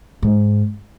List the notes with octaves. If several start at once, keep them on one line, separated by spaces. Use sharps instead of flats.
G#2